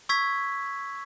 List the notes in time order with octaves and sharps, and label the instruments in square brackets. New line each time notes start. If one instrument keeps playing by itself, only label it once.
[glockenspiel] C#6 E6 G#6 B6